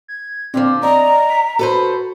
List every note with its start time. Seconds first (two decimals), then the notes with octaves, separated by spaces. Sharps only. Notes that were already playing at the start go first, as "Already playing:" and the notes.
0.08 G#6
0.54 A#2 D3 F3 C4
0.83 D5 D#5 A#5
1.30 B6
1.59 F#4 A4 B4 C5